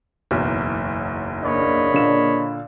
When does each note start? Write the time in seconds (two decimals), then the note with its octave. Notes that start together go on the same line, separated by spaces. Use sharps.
0.31 F#1 B1 E2
1.43 C#3 A#3 D4 C#5 D#5 B5
1.93 A#2 D3 E7